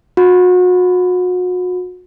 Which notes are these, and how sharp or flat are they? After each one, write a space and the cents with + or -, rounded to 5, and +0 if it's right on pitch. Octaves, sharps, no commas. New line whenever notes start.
F#4 -35